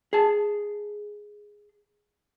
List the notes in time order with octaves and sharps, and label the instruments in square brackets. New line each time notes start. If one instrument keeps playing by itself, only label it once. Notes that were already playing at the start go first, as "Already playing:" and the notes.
[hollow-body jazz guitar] G#4 A5